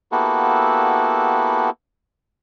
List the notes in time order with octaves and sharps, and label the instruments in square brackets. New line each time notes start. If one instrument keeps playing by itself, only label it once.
[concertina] A#3 B3 E4 F#4 G4 A4